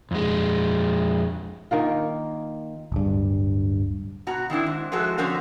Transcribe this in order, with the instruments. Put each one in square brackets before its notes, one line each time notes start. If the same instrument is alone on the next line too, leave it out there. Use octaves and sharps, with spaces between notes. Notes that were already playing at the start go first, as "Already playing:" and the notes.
[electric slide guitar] F2 G#3
[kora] D#3 A#3 F4
[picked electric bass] D1 G2
[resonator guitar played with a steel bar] B2 F#4 A#5
D#3 C4 D4 E4
G#2
F3 G#3 A3 F#4 A4
D3 F3 C4 C#4 F#4 A#4